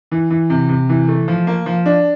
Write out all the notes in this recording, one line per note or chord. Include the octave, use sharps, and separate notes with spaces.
E3
E3
C3
C3
E3
A3
F3
A#3
F3
D4